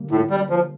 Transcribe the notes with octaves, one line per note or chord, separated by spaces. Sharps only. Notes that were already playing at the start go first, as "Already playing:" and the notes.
Already playing: D3 G3 A#3
A2
G3
F3